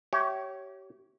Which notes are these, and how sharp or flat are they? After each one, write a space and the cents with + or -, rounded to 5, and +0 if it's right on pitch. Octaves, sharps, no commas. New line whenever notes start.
G4 -30 C#5 +0 E5 +0